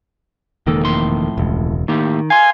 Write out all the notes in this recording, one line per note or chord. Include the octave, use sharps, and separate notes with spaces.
E1 C#2 D#3 A#3 A4
F2 A2 C6
E1 C#2
A2 D#3 A#3 G4
F5 G#5 C6